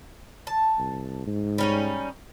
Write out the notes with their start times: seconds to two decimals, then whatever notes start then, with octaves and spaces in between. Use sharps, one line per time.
0.47 A5
0.79 C2
1.27 G#2
1.58 G3 C#4 D#4